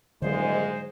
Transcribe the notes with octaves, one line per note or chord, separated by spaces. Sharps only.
D#1 G#2 D3 F#3 G#3 C5